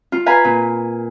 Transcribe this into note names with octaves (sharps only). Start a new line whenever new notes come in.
F4
B4 F5 G#5 A#5
A#2